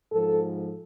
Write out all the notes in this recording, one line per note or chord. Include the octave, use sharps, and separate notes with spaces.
G#2 F3 A4